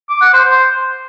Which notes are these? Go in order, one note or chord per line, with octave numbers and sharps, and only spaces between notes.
D6
F#5
C5
C5